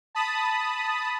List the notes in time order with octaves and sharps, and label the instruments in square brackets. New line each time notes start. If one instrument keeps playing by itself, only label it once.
[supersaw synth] A5 B5 D#6